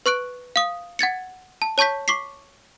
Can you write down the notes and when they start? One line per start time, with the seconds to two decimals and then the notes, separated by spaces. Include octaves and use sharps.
0.06 B4 C#6 F#6 D7
0.56 F5 D#6
0.99 F#5 G#6 A6 C#7
1.62 A5
1.78 C#5 A5 C#6 G6 B6
2.08 C#6 D6 B6 C7